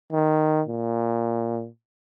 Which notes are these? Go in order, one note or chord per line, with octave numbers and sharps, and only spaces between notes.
D#3
A#2